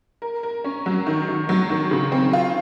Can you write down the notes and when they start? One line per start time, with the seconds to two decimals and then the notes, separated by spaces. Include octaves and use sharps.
0.22 A#4
0.43 A#4
0.64 C#4
0.86 F#3
1.07 D#3
1.28 D#3
1.49 F#3
1.70 D#3
1.91 C#3
2.12 C4
2.33 F4